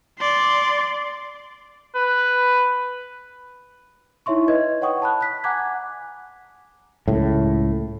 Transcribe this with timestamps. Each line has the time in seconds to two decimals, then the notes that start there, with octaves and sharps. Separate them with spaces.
0.19 D5 C6
1.95 B4
4.26 D#4 E4 C#5 E5 C6 C#6
4.48 B4 D#5 G#6
4.81 C#5 F#5 G5 C#6 D#6
5.02 A5 B5 F#6
5.21 F#6 B6
5.44 F#5 G#5 A#5 D6 F#6 G#6
7.08 C#2 A2